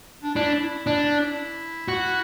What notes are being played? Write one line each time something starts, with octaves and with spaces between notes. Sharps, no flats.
D4
D4 E4
E4
D4 E4
F#4